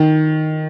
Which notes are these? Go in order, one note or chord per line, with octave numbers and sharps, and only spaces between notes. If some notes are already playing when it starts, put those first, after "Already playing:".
Already playing: D#3